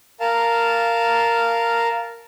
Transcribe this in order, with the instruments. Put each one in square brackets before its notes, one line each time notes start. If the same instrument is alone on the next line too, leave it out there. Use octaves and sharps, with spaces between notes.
[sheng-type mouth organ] A#4 F5 A5